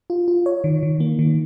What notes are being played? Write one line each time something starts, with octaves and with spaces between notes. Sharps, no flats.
F4
F4
C#5
D#3
D#3
A#3
D#3